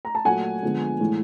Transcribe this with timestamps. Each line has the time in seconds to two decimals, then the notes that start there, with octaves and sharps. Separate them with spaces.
0.05 A#5
0.15 A5
0.25 A#2 F#3 A3 F#5 G#5
0.62 D3 F3 G#3 B3
1.00 A2 E3 G#3